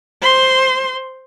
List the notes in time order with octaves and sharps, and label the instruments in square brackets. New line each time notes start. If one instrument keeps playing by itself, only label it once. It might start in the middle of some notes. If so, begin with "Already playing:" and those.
[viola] C5 C6